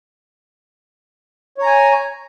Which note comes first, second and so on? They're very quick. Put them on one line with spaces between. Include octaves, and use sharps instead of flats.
C#5 A#5 G#5